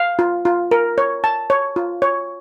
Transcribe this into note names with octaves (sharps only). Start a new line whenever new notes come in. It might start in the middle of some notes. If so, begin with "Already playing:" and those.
Already playing: F5
F4
F4
A#4
C#5
A5
C#5
F4
C#5